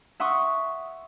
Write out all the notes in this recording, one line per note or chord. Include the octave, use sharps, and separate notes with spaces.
E5 F#5 C6 C#6 D#6